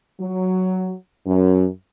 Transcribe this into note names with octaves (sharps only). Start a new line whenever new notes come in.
F#3
F#2